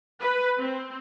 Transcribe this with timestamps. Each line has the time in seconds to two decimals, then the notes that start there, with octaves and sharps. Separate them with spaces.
0.20 B4
0.57 C4